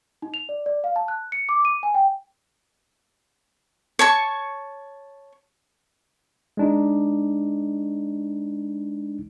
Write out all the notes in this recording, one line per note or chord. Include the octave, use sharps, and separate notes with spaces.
D#4
F7
D5
D5
F5
A5
F#6
C#7
D6
D#7
G#5
G5
C#5 A5 C#6
G#3 D4 D#4